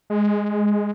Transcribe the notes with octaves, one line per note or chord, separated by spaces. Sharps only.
G#3